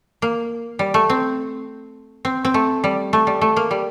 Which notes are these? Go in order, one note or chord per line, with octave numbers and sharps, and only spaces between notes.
A#3
G3
A3
C4
C4
C4
A3
G3
A3
G3
A3
A#3
G3